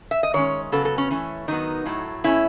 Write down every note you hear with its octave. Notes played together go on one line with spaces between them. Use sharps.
E5
D#5
D#3 G#3 C#4 C#5
C#3 F#3 B3 A4
A4
C#4
E3 A3 C#4
D#3 F#3 B3 D#4
A2 F#3 A3
B2 A3 C#4 E4